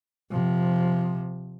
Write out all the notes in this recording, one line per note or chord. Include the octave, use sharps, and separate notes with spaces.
C3 F3